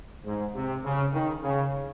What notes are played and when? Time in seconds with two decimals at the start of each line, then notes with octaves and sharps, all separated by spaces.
0.25 G#2
0.55 C3
0.84 C#3
1.13 D#3
1.42 C#3